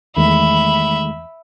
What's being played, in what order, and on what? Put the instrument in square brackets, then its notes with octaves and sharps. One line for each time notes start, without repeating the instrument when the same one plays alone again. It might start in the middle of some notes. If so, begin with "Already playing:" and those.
[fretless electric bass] E2 [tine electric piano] D#3 G#3 A3 [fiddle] E5 B5